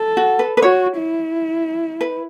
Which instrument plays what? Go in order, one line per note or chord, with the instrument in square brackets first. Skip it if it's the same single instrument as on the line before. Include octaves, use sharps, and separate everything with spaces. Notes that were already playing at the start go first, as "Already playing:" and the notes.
Already playing: [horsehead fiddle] A4
[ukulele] F#4
B4
B4
[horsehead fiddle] F#4 [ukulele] C#5
[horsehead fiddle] E4
[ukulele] B4